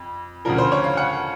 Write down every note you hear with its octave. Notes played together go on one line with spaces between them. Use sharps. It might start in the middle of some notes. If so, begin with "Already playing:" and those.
Already playing: F2
D2 C#3 F3 A#4
C5
C#5
F5
F#5